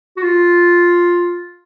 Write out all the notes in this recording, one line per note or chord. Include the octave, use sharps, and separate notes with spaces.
F#4
F4